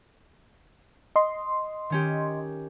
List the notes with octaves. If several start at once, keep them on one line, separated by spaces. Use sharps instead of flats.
D#5 C6
D#3 C#4 G4